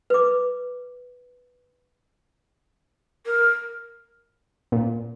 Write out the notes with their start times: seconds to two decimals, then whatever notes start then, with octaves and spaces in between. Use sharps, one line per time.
0.10 B4 D6
3.26 A#4
4.72 A#2